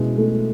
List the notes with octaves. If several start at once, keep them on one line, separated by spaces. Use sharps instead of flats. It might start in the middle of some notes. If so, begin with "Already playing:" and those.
Already playing: B2 G#3 C#4 E4
A3